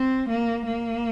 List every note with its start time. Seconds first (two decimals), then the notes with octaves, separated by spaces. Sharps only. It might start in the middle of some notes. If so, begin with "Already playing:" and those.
Already playing: C4
0.29 A#3
0.66 A#3